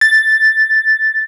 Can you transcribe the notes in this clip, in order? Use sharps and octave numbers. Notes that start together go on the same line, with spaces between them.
A6